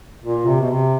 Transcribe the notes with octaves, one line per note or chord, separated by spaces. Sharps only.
A#2
C3
B2
C3